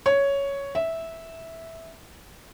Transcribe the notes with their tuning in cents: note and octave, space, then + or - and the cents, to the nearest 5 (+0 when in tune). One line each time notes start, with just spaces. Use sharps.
C#5 +5
E5 -10